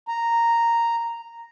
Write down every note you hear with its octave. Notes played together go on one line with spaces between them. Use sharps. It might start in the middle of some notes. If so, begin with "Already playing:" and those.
A#5